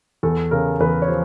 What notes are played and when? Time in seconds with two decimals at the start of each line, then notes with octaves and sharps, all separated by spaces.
0.23 E2 A4
0.51 C#3 A#4
0.80 E2 B4
1.02 C#5
1.08 F3 C5